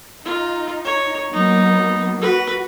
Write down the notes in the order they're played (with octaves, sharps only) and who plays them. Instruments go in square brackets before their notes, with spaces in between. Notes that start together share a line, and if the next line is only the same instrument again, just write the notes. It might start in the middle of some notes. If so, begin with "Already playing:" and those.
[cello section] D#4 [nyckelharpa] F4
[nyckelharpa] C#5
[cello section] F#3 A#3 B3 [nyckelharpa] D#4
[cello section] F#4 [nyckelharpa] B4